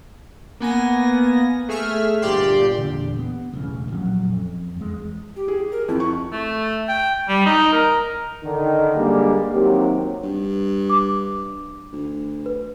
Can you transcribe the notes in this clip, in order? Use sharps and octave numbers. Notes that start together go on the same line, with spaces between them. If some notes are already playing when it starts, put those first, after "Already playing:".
A#3 B3 G#5 A#6
A3 G#4 E5 F6
G1 A#2 G4 D5 G5 C6
E2 A#2 D3
B3
E1 A1 C#3
A#2 F3 F#3 C#4
F2
E2 G#3
G4
G#4
A#4
F2 E4
C#6
A3
G5
G3
D#4
A#4
D3 D#3
D3 G3 G#3 A#3
D#2 C3 F#3 C4 G4
G2
D6
D2
B4